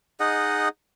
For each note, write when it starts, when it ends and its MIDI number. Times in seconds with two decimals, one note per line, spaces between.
0.20 0.69 63
0.20 0.69 68
0.20 0.69 75
0.20 0.69 78